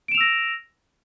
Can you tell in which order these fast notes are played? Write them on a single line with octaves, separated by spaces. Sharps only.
D7 E7 F7 E6 A#6